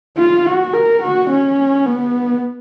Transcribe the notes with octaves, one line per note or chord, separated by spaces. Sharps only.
F4
F#4
A#4
F#4
C#4
B3